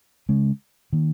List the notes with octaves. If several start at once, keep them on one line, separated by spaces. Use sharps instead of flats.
C#3 G#3 C#4
D#3 A#3